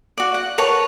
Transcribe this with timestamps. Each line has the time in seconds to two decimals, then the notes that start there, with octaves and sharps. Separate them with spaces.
0.17 F#4 D5
0.34 F#5
0.58 A#4 B4 C#5 A5